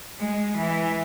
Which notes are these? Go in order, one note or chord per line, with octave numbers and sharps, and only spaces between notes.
G#3
E3